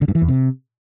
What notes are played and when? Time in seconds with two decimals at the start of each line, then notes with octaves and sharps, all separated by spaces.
0.02 D3
0.08 G2
0.15 E3
0.22 E2
0.28 C3